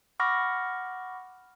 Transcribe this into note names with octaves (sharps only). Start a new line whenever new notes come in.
F#5 B5 C#6 D6 F6 A#6